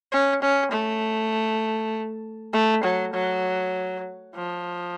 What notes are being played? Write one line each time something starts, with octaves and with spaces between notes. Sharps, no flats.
C#4
C#4
A3
A3
F#3
F#3
F3